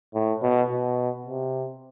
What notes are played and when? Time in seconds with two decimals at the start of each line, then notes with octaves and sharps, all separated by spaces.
0.14 A2
0.42 B2
0.70 B2
1.26 C3